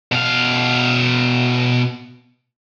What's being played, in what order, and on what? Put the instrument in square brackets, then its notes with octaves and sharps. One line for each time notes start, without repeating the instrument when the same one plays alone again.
[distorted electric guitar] B2 F5